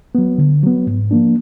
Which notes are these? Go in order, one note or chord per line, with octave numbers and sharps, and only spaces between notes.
F#3 B3
D3
F#3 B3
G#2
F3 A#3 D4